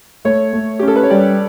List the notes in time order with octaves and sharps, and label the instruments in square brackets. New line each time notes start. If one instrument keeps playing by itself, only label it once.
[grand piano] A3 [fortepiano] C#5
[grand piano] A3
[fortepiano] G4
[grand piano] C#4
[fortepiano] A4
B4
C#5
[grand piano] G3 [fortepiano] D5